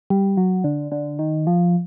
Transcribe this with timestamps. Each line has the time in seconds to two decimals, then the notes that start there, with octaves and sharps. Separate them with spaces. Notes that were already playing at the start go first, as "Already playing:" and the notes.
0.10 G3
0.37 F#3
0.64 D3
0.92 D3
1.19 D#3
1.47 F3